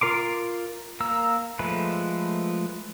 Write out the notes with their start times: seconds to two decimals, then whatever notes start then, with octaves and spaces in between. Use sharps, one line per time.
0.01 F4 A#4 C6 D6
1.00 A#3 A#4 E6
1.59 F3 G#3 A3 B4